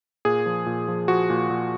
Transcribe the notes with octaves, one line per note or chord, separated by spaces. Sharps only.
A#2 G#4
F3
A#2
F3
F3 F#4
A#2
A#2